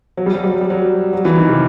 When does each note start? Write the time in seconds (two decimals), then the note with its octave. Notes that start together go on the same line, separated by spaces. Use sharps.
0.17 F#3
0.26 G3
0.34 F#3
0.44 G3
0.52 F#3
0.61 G3
0.70 F#3
1.13 F#3
1.25 E3
1.37 D#3
1.49 C3